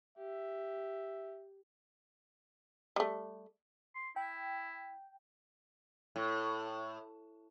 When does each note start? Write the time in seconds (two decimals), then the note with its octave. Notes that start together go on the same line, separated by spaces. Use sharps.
0.18 G4 E5
2.96 G3 A3
3.95 C6
4.16 E4 G5
6.16 A2